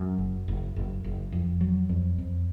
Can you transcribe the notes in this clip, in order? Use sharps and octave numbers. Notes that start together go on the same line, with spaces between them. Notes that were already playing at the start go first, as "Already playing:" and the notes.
Already playing: F#2
F#1
F#1
F#1
F#1
F2
F#3
F2
F2